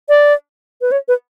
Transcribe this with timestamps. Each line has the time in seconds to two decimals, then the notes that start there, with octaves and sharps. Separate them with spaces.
0.09 D5
0.81 B4
0.92 C#5
1.08 B4